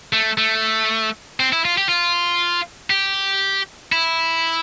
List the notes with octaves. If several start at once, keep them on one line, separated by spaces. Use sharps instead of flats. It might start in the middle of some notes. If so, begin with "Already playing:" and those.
A3
A3
C4
E4
F4
G4
F4
G4
E4